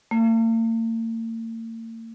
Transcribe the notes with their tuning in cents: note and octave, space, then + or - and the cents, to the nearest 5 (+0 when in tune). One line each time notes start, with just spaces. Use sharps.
A#3 -45